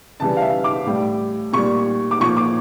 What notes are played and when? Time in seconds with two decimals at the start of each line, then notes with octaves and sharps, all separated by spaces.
0.20 C#3 E3 G3 A5
0.37 F5
0.42 E5
0.64 D6
0.86 A2 G3
1.53 A#2 G3 C#6
2.11 D6
2.20 A#2 F3 C#6
2.37 D6